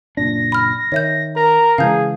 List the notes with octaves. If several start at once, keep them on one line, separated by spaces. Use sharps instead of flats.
F#1 A#2 D4 A#6
B5 F6
D#3 C#5 E5 G6
A#4 A#5
C#3 E3 G#3 G#4 F5 A5 G6